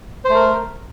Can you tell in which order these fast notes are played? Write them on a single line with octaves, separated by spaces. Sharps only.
C5 A3 A#4